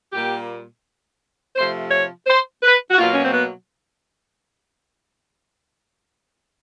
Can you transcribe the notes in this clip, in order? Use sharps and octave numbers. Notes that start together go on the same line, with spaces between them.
A#2 G3 A#3 G4
C3 F3 A3 C5
C#5
C5
B4
F#4
B2 F#3 A#3 F4
C#4
C4
B3